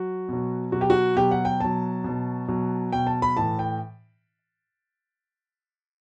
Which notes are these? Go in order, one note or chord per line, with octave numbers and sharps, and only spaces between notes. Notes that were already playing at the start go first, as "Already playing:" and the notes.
Already playing: F#3 F#4
B2 F#3
B2 F#3 F#4
G4
F#4
B2 F#3 G4
F#5
G5
B2 F#3 A5
B2 F#3
B2 F#3
B2 F#3 G5
A5
B5
A2 E3 A5
G5